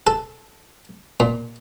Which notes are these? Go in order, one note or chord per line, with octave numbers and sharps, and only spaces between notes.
A4
A#2